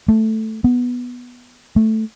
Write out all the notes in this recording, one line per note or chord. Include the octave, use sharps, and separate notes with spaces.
A3
B3
A3